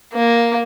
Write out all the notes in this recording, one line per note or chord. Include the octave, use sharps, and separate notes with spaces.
A#3